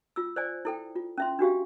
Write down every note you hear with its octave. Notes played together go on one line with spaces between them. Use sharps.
F4 E6
C5 D5 G#5
E4 A4 G5
F4
C#4 E5 C6
D4 F#4 G4 F5